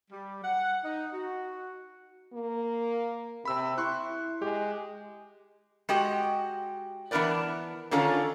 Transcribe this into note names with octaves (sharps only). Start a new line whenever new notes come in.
G3
F#5
D#4
F#4
A#3
C3 B5 E6
E4 C6 C#6 F#6
G#3 G4
G#3 F#4 G4 D#5 G5
E3 B3 D4 A#4 B4 D5
D3 D#3 C#4 F4 A4